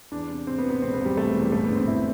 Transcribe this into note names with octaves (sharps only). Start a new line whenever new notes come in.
E2 D4
C3
C3 C4
B3
C3
B3
E1 C4
B3
E1
G3
E1 A3
E2
G3
A1 A3
B3
D3
C4
D3 E4